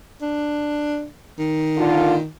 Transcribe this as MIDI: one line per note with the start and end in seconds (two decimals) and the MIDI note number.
0.21 1.06 62
1.38 2.27 51
1.77 2.15 46
1.77 2.15 50
1.77 2.15 65